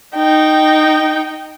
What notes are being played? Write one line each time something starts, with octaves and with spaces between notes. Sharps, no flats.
D#4 G5